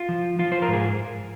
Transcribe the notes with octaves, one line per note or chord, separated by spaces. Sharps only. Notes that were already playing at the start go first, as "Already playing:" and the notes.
Already playing: F4
F3
F3 F4
C5
A#4
G#2 G#4